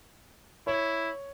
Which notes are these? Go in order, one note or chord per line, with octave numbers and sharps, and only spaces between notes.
E4 C#5